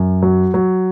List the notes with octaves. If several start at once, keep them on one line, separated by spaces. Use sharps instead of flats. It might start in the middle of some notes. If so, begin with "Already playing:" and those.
Already playing: F#2
F#3
F#3